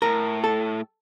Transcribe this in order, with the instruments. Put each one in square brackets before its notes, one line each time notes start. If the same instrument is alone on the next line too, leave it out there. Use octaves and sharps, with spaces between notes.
[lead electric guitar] A2 [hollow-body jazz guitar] A#4
[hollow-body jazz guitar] A4